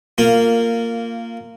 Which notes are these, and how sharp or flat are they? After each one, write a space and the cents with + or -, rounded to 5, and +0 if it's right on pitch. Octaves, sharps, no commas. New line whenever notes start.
A#3 -15 F4 +0